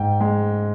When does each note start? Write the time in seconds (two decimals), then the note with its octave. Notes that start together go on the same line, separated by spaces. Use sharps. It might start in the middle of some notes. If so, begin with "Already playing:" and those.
Already playing: G#2 G5
0.20 G#3